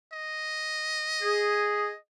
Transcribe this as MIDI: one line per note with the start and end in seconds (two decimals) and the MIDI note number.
0.13 1.98 75
1.22 1.88 68